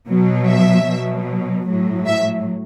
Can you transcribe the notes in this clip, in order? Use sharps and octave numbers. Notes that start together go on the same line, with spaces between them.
B2 F#3
E5
B2 F#3
A2 F#3
E5